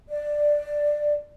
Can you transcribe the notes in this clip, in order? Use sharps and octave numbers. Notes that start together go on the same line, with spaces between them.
D5